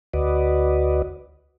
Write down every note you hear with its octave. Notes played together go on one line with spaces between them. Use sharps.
D2 F#4 B4 D5 D#5